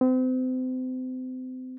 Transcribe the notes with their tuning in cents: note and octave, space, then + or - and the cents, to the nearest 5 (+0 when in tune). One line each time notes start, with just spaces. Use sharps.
C4 -35